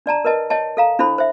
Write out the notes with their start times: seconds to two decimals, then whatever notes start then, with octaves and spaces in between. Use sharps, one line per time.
0.06 D4 D5 A5 A#5
0.25 A#4 B4 D#5 A5
0.50 C#5 D#5 G5 A5
0.77 A4 F5 A#5
0.99 D4 E4 A4 C5 B5
1.18 C5 E5